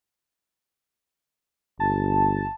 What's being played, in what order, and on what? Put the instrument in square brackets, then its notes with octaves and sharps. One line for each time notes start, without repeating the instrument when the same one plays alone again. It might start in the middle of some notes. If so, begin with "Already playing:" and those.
[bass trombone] G1 [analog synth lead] A5